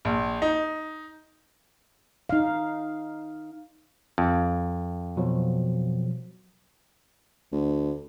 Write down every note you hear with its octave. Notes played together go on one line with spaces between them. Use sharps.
A#1
D#4
D#4 F5
F2
B2 F3 F#3
D2